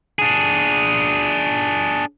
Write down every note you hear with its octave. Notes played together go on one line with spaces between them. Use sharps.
D4 G#4